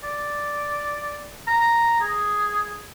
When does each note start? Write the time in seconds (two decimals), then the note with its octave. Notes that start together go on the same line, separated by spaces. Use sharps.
0.04 D5
1.48 A#5
2.01 G#4